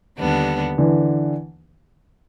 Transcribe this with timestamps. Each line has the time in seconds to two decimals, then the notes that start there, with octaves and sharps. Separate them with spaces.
0.19 D#2 D3 G3 B3 D4
0.78 D3 E3